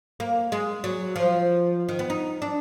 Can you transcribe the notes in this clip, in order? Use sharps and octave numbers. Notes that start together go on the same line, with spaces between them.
A#3
G#3
F#3
F3
D#3
B3
D#4
D4